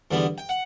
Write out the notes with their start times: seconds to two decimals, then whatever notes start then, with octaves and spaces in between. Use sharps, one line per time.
0.11 E2 D3 G3 B3
0.38 G5
0.49 F#5